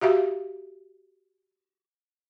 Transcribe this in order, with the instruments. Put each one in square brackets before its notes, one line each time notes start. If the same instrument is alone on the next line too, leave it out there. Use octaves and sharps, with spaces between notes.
[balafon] F#4 G4 E5 F5